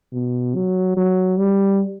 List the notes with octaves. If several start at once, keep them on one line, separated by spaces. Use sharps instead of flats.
B2
F#3
F#3
G3